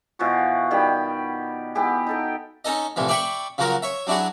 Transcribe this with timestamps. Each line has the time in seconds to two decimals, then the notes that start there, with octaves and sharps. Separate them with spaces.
0.19 B2 E3 F3 F#4
0.71 D#3 G3 G4 B5
1.75 B3 E4 G4 G#4
2.07 D#4 A4 G5
2.65 C#4 D#4 A4 D#5
2.96 C2 A2 E3 F3
3.08 D5 E5 G5 B5 C#6
3.58 C#3 F3 F#3 F#4 A#4
3.82 C#5 E5
4.07 F#3 D4 E4 F#4 G#4